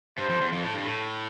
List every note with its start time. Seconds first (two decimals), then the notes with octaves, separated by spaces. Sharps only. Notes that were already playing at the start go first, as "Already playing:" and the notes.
0.18 G2 C5
0.30 F2
0.41 E2
0.52 F2
0.64 A2
0.74 G2
0.85 A2